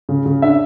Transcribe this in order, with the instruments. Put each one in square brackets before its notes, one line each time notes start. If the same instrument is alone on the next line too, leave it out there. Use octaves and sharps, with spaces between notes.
[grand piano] C#3
C#3
D4 E5